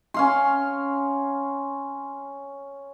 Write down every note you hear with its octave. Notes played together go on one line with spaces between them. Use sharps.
C#4 F5 C6